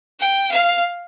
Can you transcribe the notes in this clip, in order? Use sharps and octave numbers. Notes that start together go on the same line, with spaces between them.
G5
F5